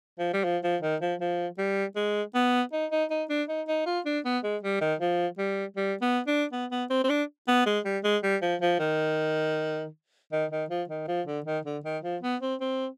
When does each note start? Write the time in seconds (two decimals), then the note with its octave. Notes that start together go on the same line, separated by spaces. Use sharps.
0.19 F3
0.34 G3
0.44 F3
0.63 F3
0.82 D#3
1.01 F3
1.21 F3
1.58 G3
1.96 G#3
2.35 B3
2.73 D#4
2.91 D#4
3.11 D#4
3.29 D4
3.49 D#4
3.68 D#4
3.86 F4
4.06 D4
4.25 B3
4.44 G#3
4.63 G3
4.81 D#3
5.00 F3
5.38 G3
5.77 G3
6.01 B3
6.27 D4
6.52 B3
6.71 B3
6.90 C4
7.04 C4
7.10 D4
7.48 B3
7.66 G#3
7.85 G3
8.04 G#3
8.23 G3
8.42 F3
8.61 F3
8.80 D#3
10.33 D#3
10.51 D#3
10.70 F3
10.89 D#3
11.08 F3
11.27 D3
11.46 D#3
11.65 D3
11.85 D#3
12.03 F3
12.23 B3
12.41 C4
12.60 C4